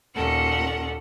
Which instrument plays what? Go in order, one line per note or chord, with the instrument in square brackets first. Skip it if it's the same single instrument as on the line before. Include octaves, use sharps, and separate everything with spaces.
[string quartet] D#2 A#2 C#4 A4 A#4 F#5